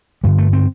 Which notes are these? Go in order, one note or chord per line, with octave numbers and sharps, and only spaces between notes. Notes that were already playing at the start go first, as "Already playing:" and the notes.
G2 D3 G3
A3
C4